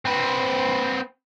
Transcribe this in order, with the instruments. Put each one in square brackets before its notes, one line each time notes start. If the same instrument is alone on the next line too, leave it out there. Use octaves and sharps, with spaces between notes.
[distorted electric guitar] C4 B4